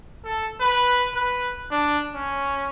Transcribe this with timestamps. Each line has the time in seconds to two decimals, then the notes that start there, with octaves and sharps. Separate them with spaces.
0.24 A4
0.61 B4
1.16 B4
1.71 D4
2.15 C#4